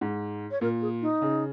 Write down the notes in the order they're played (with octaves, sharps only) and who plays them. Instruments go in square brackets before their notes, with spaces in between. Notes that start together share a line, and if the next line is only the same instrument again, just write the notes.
[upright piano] G#2
[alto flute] C#5
[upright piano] A#2 [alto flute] A#4
[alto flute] G#4
D#4
[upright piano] C#3